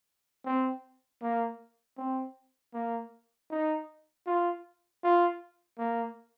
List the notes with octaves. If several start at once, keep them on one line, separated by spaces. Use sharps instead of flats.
C4
A#3
C4
A#3
D#4
F4
F4
A#3